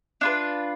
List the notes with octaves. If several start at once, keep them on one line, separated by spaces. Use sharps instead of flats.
D4 F4 B4